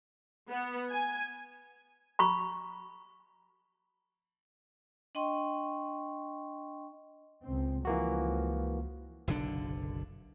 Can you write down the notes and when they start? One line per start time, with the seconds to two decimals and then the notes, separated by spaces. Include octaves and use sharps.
0.49 B3
0.90 G#5
2.19 A#5 B5 C#6
5.15 D4 D#5 G5 C6 C#6
7.44 C#2 C4
7.85 C#2 E3 F3 A#3 F#4
9.28 F#1 B1 D3 D4